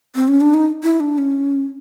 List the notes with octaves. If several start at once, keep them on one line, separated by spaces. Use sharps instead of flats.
C4
C#4
D4
D#4
E4
D4
C#4